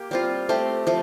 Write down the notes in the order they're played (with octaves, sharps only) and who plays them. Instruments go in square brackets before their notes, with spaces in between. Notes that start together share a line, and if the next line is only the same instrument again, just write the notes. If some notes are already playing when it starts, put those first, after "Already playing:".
Already playing: [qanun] A#3 G4
G3 C4 F4
A3 C4 G4
F3 A3